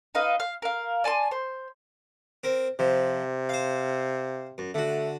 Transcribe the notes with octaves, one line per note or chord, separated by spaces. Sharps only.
D#4 B4 D#5 F5
F5
A#4 F5
D5 G#5 A5 C6
C5
C4 A#4
C3 F3
C5 F5
F#2
D3 A3 F#4